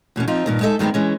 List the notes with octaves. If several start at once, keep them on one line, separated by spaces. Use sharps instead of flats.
E2 B2 A#3 C#4
F3 C4 D#4 F4
G2 A#2 D#3
G#3 D#4 A4 E5
G2 D#3 G#3 B3 C4
E3 G#3 C#4